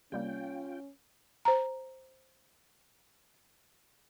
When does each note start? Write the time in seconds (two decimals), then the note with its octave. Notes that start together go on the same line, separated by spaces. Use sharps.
0.12 C3 G3 A#3 C#4 F4 G5
1.45 C5 A#5